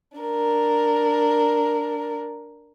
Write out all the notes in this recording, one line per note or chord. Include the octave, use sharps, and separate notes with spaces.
D4 A#4